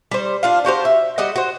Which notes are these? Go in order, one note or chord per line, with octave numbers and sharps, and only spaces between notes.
G3 C5
D4 F4 F5
D4 F#4 G4 C5
E5
G3 F#4 D#5 F#5
F#4 C5